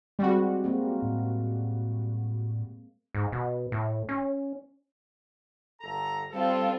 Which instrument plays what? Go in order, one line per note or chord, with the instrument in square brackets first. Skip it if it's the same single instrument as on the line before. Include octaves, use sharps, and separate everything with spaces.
[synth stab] G3 F#4 [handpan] G#3 C4
[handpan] G#3 A#3 C4
[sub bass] A2
[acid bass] G#2
B2
A2
C#4
[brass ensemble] G1 A4 A#5
[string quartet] G3 C4 F4 [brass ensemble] A4